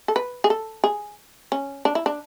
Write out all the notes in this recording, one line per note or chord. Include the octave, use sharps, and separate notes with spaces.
A4
B4
G#4
A4
G#4
C#4
D4
E4
D4